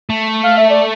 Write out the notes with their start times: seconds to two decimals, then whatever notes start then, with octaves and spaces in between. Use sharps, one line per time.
0.10 A3
0.44 F5
0.57 E5
0.70 D5